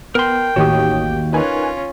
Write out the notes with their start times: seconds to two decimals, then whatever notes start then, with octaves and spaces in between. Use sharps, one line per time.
0.15 B3 A#4 G5 C6
0.56 A1 D#2 D#3 F#4 G4 C#5 D#6
1.33 C#4 D#4 F4 A#4 B4 G#5 F#6